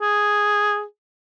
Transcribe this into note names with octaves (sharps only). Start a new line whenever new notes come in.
G#4